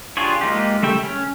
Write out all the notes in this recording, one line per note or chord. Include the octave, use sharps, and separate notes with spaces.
D4 F4 G4 G#4 C#5
G#3 A#3 D#4 F4 G4
C#3 G3 A3 E5 G5
C#4